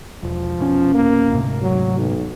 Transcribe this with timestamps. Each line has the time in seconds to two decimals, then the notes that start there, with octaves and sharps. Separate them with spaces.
0.23 E1 F3
0.59 F1 B2 C#4
0.94 A#3
1.32 D2 G#2 C3
1.62 F#3
1.98 B1